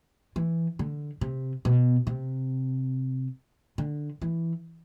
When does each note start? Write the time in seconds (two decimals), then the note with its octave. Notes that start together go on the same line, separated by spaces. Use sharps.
0.36 E3
0.79 D3
1.21 C3
1.65 B2
2.07 C3
3.78 D3
4.22 E3